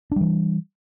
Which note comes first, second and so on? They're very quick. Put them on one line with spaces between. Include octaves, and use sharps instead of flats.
D4 G3 E3